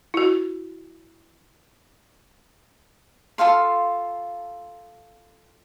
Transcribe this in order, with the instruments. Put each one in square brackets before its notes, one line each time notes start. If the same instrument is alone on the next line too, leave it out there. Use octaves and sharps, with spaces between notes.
[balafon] E4 F#4
[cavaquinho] F4 A4 F5 C6